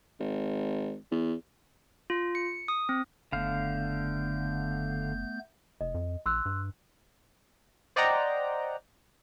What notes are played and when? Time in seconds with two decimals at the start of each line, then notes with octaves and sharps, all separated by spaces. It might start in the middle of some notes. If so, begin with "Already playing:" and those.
0.20 G#1
1.11 E2
2.10 F4
2.35 C#7
2.68 D#6
2.89 C4
3.32 F#1 D3 A3 B3 F5 G6
5.81 F1 D#5
5.94 F2
6.26 A#1 C6 E6 F#6
6.45 G2
7.96 C5 D5 D#5 F#5 G5 A#5